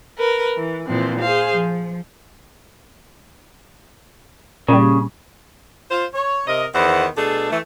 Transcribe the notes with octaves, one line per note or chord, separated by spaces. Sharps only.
A#4 B4
E3
A#2 E3 F3 C4
G#4 C5 F5
F3
A#2 C#3 G3
F4 C5
C#5
C3 A#4 D#5
E2 D#3 B3 C5 F#5
B2 A3 D4 G#4 A4
E3 A3